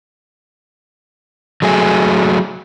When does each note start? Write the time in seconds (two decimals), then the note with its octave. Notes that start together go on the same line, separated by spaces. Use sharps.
1.62 F#3 A3 G#4